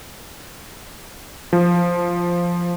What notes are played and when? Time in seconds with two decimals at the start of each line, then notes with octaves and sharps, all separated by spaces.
1.53 F3